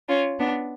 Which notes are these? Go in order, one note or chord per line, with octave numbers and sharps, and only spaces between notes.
C#4 F4
B3 D4